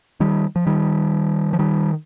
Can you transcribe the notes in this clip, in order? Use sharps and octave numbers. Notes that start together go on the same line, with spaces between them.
D#3 G3
F3
D#3 G3
F3
D#3 G3